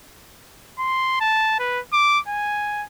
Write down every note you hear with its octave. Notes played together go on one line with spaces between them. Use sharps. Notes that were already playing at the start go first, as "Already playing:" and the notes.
C6
A5
B4
D6
G#5